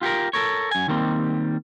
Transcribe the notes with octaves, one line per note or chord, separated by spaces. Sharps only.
F4 G4 A4 A#4
A4 A#4 C#5
F#2 G#5
D#3 G3 A#3 C4